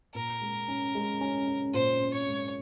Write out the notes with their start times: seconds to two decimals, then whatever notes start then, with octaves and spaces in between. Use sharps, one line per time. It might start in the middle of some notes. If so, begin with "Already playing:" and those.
0.15 A#2 A#4
0.41 G#3
0.68 C#4
0.95 G#3
1.21 C#4
1.47 C#4
1.74 A#2 C5
2.01 C#4
2.14 C#5
2.27 G#3